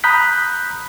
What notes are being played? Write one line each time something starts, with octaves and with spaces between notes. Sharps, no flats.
A#5 B5 D#6 F#6 G6 B6